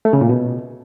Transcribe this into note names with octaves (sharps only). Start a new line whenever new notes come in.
A3
C#3
A#2
B2